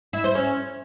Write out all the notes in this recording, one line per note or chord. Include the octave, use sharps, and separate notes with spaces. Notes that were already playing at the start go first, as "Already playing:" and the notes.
E4
C5
C#4